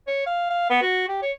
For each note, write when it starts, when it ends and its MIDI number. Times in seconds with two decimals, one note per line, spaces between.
0.07 0.25 73
0.26 0.48 77
0.50 0.66 77
0.70 0.78 59
0.82 1.05 66
1.08 1.21 67
1.22 1.32 73